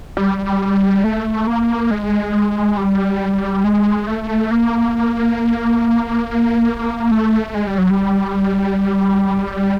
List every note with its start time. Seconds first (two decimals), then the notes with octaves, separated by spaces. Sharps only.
0.17 G3
1.04 A3
1.47 A#3
1.91 G#3
2.77 G3
3.64 G#3
4.07 A3
4.51 A#3
7.11 A3
7.54 G#3
7.67 G3
7.78 F#3
7.90 G3